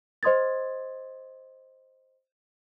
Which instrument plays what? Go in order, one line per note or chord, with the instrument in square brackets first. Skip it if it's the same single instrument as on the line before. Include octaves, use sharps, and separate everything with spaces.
[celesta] C5 D#5 C6 D#6 G#6 A6